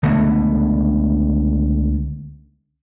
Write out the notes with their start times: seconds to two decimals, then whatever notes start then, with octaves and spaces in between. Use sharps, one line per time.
0.03 C#2 D3 A3 B3